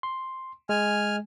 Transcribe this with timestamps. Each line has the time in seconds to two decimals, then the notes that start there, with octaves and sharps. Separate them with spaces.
0.03 C6
0.69 G#3 G#5 F6